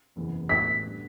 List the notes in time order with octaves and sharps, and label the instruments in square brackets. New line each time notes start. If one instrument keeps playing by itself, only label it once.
[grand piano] F#1 E2 C3 E3 B3
[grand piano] A2 G3 B3 F#4 [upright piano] B6
[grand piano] D3 G3 B3